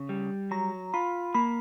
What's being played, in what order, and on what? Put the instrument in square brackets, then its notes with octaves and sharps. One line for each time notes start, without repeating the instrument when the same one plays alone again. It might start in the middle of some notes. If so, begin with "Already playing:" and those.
Already playing: [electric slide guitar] C#3
G3
[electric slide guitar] F#3 [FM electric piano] A#5
[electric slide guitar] F4 [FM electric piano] B5
[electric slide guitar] A#3 [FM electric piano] B5